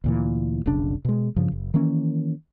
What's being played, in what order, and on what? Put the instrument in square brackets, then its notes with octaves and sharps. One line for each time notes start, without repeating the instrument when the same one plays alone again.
[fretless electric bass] D2 A#2 E3
F1 B1 C#3 D4
B2 G#3
G2 C#3 F3
F#1
D#3 E3 A#3 C#4